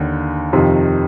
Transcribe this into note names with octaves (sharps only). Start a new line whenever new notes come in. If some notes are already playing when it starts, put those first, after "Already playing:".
Already playing: D#2 D3
F2 C3 D#3